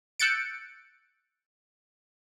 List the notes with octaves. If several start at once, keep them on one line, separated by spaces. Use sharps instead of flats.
E6 F#6 G6 A6 C#7 D7